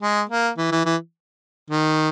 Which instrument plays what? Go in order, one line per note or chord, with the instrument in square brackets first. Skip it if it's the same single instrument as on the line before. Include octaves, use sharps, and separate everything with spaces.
[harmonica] G#3
A#3
E3
E3
E3
D#3